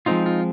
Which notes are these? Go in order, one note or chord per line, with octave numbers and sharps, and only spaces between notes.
F3 G#3 C4 D#4 F4
F4